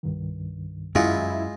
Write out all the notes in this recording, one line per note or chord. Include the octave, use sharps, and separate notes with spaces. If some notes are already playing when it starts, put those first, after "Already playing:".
C2 G2 D#3
F#2 G#3 E4 F4